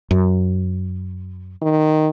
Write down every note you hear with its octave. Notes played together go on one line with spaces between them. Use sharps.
F#2
D#3